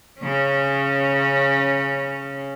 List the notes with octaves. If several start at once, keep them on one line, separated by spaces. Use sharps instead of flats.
C#3 C#4